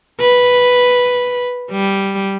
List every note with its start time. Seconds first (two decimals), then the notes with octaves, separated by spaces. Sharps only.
0.20 B4
1.71 G3